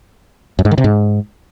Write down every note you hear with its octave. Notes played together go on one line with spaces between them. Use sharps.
F#2
G#2
D#3
C3
G#2